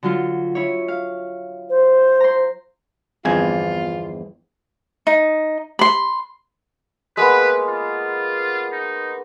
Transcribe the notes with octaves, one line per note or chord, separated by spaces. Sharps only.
D3 F#3 F4
E4 C#5
F5
C5
A#5 C6
G1 E2 E3 F3 C4 F4 G#5
D#4
B5 C6
G#3 A#3 B3 B4
F4
D#4